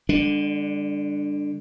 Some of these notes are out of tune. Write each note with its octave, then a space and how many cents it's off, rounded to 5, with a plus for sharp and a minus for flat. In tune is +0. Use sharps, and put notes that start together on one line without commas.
D3 +0 G3 +40 D4 +0